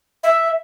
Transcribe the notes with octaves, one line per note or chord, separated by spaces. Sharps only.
E5